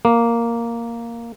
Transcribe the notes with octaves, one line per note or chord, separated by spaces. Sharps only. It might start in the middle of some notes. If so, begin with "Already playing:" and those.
A#3